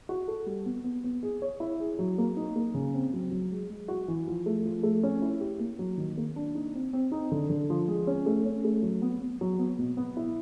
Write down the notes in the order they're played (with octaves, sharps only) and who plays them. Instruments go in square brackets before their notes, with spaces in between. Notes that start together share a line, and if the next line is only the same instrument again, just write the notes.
[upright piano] F#4
A4
G3
B3
B3
B3
G#4
C#5
E4
G#4
F#3
A#3
D#4
A#3
C#3
C4
F#3
F#3
G#3
G#3
F#4
E3
F3
A3
F3
A3
C#4
E4
G4
A#3
F#3
D#3
A#3
D4
D#4
C4
C4
D#4
D3
D3
F3
G#3
C#4
A3
C#4
A3
F#3
B3
B3
F#3
B3
B2
B3
E4